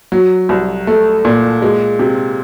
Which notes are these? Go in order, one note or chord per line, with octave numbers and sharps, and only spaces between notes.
F#3
C2
A3
A#2
G#3
C3